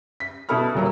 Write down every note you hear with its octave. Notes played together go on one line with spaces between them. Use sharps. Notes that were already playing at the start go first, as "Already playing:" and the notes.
B6
B2 E4 A4 B5 F6
D#1 F#3 A#3